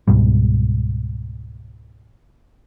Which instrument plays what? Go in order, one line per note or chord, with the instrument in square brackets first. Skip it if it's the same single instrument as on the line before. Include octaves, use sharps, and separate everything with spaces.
[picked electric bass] C#2 G#2 B2 G3